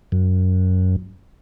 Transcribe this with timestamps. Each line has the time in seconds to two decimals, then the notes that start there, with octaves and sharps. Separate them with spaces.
0.12 F#2